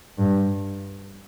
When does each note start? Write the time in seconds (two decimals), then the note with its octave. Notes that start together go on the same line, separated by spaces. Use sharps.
0.18 G2